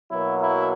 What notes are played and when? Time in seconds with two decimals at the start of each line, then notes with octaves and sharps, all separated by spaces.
0.10 B2 F#3 A#3 E4
0.40 E4